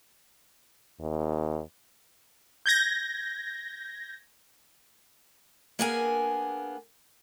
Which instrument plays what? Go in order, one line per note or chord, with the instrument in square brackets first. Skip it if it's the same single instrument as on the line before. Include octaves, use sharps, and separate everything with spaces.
[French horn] D#2
[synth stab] G6 G#6 A#6
[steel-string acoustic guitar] A#3 B3 D4 G#4 A#4 G#5